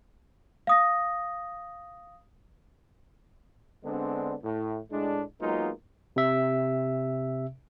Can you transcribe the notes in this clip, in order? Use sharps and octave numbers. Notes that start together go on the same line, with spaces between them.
F5 D#6 A#6
D3 G#3 B3 C4 D4
A2
A2 G#3 D4
F#3 G#3 A#3 B3 D#4 F4
C3 E5